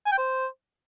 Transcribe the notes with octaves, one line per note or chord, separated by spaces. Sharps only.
G#5
G5
C5